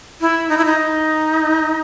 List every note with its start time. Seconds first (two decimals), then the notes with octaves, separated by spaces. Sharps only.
0.21 E4
0.49 D#4
0.58 E4
0.65 D#4